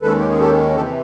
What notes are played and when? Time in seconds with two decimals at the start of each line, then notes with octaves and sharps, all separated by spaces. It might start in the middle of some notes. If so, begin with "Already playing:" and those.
0.02 D#2 D#3 G#3 C#4 A4 B4
0.18 G4
0.29 G#4
0.39 G4 A4
0.76 C3 E3 G4 A4